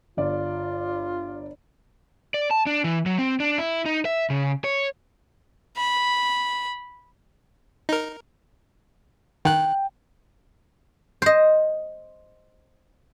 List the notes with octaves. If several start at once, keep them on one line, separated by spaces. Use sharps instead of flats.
G1 F4 D5
D5
A5
D4
E3
F#3
C4
D4
E4
D#4
E5
C#3
C#5
B5
D#4 A#4
D#3 G5 F#6
C5 D#5